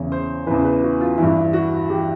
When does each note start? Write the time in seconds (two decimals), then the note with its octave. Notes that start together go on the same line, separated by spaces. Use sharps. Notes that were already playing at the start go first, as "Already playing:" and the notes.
Already playing: E2 C#3 E3 C#5
0.12 C5
0.46 E2 C#3 E3 B4
0.65 B4
0.83 F#4
1.00 F4
1.18 G2 E3 E4
1.53 F#4
1.89 E3 G4